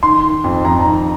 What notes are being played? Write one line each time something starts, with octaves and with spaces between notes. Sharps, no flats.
D#3 C6
D#3
F2
F2 A#5
D#3 A#5